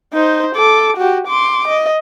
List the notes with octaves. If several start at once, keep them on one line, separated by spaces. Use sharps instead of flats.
D#4 C5
A4 D6
F#4 G4
C6 D6
D#5